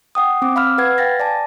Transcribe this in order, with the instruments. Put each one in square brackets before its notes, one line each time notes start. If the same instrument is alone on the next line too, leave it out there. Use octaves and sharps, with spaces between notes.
[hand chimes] F#5 G5 D#6
C4 D6
F5 B5 E6 F6
B4 F#5 B5 G#6
F5 G5 A6 A#6
D5 G#5 A5